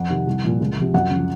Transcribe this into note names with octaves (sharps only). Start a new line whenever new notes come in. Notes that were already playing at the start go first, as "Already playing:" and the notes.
Already playing: F2 F#5
C3 D#3
C2
A#2 F3
C#2
C3 F3
F#2 F#5
C#3 F3